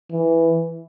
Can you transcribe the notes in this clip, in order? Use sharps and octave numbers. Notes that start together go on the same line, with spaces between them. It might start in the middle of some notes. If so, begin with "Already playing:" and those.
E3